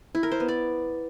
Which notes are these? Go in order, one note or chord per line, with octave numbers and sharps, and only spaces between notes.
E4
A#4
C5
B3
D5